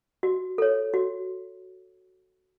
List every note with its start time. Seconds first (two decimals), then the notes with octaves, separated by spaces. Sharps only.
0.23 F#4
0.58 A4 C#5
0.94 F#4